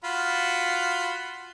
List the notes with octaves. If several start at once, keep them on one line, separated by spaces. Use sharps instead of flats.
F4 F#4 B5